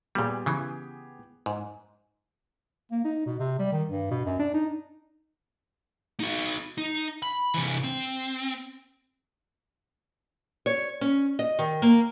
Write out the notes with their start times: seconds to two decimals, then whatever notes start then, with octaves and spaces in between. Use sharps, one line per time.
0.15 A#2 G3 B3 G4 G#4
0.46 C#3 E3
1.46 G#2
2.92 A#3
3.05 D#4
3.26 B2
3.39 C3
3.59 G3
3.72 D#3
3.89 G2
4.11 B2
4.25 F#2
4.39 D4
4.54 D#4
6.20 D#4 F#4
6.78 D#4
7.22 B5
7.54 C3 E3
7.84 C4
10.66 C#5
11.01 C#4
11.39 D#5
11.59 D#3
11.82 A#3